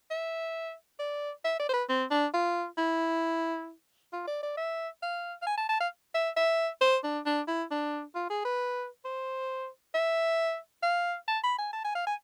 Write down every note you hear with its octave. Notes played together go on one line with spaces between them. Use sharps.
E5
D5
E5
D5
C5
B4
C4
D4
F4
E4
F4
D5
D5
E5
F5
F5
G#5
A5
A5
F5
E5
E5
C5
D4
D4
E4
D4
F4
G#4
B4
C5
E5
F5
A5
B5
G#5
A5
G#5
F5
G#5